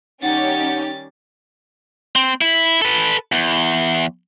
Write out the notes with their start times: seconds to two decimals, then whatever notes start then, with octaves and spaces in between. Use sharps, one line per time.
0.22 D#3 G3 C#4 D#4 G4 F#5 A6
2.16 C4
2.41 E4
2.82 A4 B4
3.32 E2